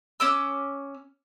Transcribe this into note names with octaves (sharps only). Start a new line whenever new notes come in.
C#4 D6 E6